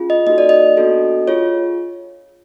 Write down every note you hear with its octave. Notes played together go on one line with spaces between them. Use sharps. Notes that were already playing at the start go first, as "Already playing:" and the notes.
Already playing: C#4 F4 G#4
D#5
A#3 D#4 F#4 A4 D#5
D5
D#5
B3 D4 F#4 A4
F4 G#4 C#5